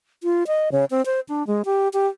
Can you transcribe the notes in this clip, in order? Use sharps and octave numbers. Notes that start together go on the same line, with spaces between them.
F4
D#5
C#3
C4
C5
D4
G#3
G4
G4